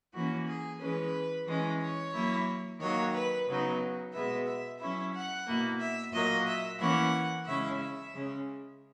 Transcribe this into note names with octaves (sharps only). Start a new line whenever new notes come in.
E3 A#3 C#4 F#4
G#4
E3 G#3 C#4 B4
E3 G#3 C#4
C#5
F#3 A#3 E4
D#3 F#3 A#3 C#5
B4
C#3 F#3 B3 D#4
B2 G#3 B3 E5
E5
F#3 C#4 E4 E5
F#5
B2 A#3 E4
E5
A#2 F#3 A#3 D#5
E5
E3 A#3 C#4 E4 F#5
C#3 G#3 C#4 E4 E5
E5
C#3 G#3 C#4